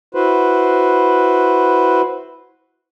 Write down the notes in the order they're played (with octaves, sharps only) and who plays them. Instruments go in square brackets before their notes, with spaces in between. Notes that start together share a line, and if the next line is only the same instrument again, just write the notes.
[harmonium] E4 F#4 B4 C5